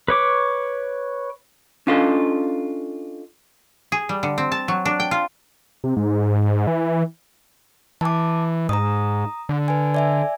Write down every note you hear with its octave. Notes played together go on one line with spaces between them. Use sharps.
B4 C#5 D6
C#4 D4 F4 A4 D#5
G#4
G3
D3
C4
A5
F#3
D4
G5
F4
C3
G#2
E3
E3 A5 D6
G#2 A#5 D#6
D3
B4 G#5
D5 E5 G#5